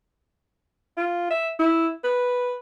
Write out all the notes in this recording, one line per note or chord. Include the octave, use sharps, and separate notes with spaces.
F4
E5
E4
B4